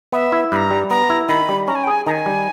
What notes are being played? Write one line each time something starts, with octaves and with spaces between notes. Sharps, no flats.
B3 E5
E4
G2 A#5 B5
G3
B3 A#5
E4
D#3 B5
G3
C#4 A#5
G#5
G5
G#4 G#5
D#3 G#5 A#5
G3